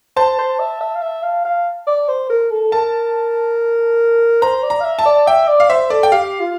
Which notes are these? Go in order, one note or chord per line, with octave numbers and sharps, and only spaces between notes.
C5 A5
C5
E5
E5
F5
E5
F5
F5
D5
C5
A#4
A4
A#4 A5
C5 A#5
D5
A#5
F5
E5
A5
D5
E5 G5
D5
F5
C5 E5
A4 D5
G5
G4 F5
F4